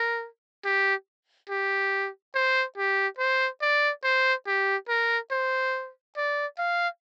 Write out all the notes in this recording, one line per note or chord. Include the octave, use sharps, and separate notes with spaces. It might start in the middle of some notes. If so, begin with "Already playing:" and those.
Already playing: A#4
G4
G4
C5
G4
C5
D5
C5
G4
A#4
C5
D5
F5